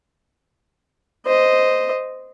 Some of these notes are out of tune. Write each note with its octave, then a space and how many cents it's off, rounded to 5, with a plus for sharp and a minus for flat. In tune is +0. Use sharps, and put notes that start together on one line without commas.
C5 -10 D#5 +0